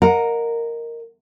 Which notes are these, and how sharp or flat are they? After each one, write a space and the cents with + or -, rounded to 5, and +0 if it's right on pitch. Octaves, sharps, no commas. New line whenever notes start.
A#4 -5 D#5 +0 F#5 -35